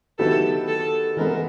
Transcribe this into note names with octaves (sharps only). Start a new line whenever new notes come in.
D#3 F#3 B3 E4 G4 A4
A4
E3 G#3 B3 A#4